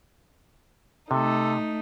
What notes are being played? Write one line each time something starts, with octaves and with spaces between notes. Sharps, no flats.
C3 A3 D#4 A4